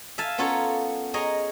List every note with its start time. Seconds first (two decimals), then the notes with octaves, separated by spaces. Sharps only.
0.18 E5 F5 G#5 A5
0.38 B3 C#4 F4 A4 A#4 C#5
1.14 G#4 C#5 D#5 A#5